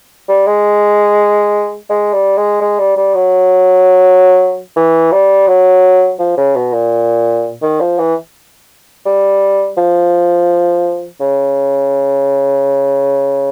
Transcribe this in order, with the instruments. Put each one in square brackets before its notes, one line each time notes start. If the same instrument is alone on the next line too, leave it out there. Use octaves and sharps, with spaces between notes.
[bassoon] G3
G#3
G#3
G3
G#3
G#3
G3
G3
F#3
E3
G3
F#3
F3
C#3
B2
A#2
D#3
F3
E3
G3
F3
C#3